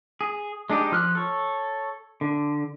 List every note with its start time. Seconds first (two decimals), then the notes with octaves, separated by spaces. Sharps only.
0.21 G#4
0.70 G#3 D4 D#4 G4
0.92 F3 F6 F#6
1.15 A4 C#5
2.21 D3